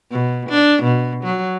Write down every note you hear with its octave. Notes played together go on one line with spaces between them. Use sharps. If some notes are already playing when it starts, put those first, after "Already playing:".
B2
D4
B2
F#3